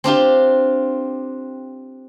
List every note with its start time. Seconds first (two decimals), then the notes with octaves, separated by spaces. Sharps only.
0.04 C4 D4 F4 G4